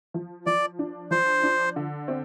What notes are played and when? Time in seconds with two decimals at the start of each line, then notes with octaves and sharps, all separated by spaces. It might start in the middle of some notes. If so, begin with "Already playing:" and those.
0.14 F3
0.46 F3 D5
0.79 D4
1.11 F3 C5
1.43 D4
1.76 D3
2.08 C4